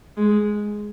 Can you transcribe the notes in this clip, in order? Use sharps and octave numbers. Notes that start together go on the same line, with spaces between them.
G#3